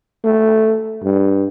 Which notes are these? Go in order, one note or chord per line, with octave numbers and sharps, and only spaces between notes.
A3
G2